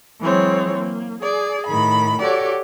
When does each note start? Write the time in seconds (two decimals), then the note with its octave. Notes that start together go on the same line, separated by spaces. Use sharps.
0.21 E3 F#3 G#3 C4 C#5
0.78 A#3
1.21 G#4 D5
1.67 A2 D#3 B5
2.22 F#4 G4 A4 C#5 D5